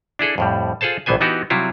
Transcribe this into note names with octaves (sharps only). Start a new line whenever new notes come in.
D4 E4 G#4 A4
F2 A2 G3
F4 G#4 A4 C5 A5
A#1 A2 E3 B3 C5 G#5
E3 B3 D#4 F#4 G4
C3 F#3 G3 E4 F4